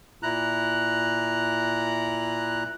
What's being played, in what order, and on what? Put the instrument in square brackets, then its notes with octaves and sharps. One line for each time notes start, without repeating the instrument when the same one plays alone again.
[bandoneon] A#2 E4 A#5 F#6